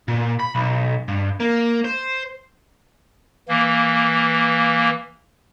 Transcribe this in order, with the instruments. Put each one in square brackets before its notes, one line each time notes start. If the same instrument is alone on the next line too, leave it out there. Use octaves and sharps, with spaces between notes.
[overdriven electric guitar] A#2
B5
B1
G2
A#3
C5
[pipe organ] E3 A#3